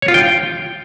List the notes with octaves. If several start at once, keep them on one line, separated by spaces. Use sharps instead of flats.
C#5
F4
G5